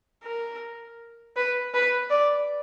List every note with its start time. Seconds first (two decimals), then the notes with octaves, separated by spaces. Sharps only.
0.24 A#4
1.36 B4
1.74 B4
2.10 D5